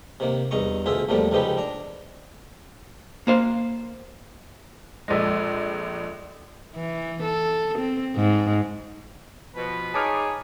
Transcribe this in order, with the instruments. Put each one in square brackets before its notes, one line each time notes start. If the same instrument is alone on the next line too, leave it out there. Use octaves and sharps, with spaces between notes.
[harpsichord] C3 D#3 A#3
E2 G2 D#4 A#5 C#6
D2 B2 F4 G#4 E5
E2 A2 F3 G3 A3 A#3
C#2 G#2 F3 D#4 G4 B4
D4 A#5
[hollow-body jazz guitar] A#3 C5 F5
[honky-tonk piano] A#1 G#3 [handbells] A4 D5 D#5
[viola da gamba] E3
A4
C4
G#2
[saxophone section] B2 F3 [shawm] B4
[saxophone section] D#4 C#5 [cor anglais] G#4 [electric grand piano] A5 D6 F6